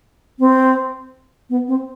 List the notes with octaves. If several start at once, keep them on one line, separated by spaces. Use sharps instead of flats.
C4
B3
C4